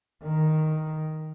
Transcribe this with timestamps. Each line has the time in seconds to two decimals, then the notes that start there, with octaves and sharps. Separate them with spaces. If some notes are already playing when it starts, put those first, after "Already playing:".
0.23 D#3